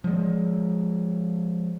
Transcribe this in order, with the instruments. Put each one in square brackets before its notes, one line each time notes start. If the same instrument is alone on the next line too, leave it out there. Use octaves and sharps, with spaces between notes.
[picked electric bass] F3 G#3